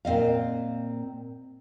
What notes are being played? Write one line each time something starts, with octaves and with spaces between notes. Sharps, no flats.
A#2 C4 D#5 F5